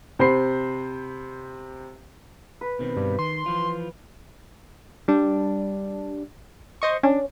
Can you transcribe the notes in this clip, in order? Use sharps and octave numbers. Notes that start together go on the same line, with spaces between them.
C3 C5 B5 C7
B4
B2 D#3 C4
G2
D#3 C6
E3 F3 F4
G3 D4
C5 D#5 C#6
C#4 D4